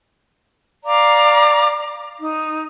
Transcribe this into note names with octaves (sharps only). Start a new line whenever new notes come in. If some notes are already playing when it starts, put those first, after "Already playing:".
D5 F5 A#5 D6
D#4